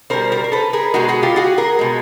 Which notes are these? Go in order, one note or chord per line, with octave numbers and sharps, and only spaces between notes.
B2 G3 A#4 C5
A#4 C5
A#4
A4 B4
G#4 A#4
B2 G#3 F#4 G#4
F#4 G#4
F4 G4
F#4 G#4
G#4 A#4
B2 G#3